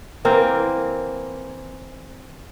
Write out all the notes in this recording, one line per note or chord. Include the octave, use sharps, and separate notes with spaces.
E3 A#3 C4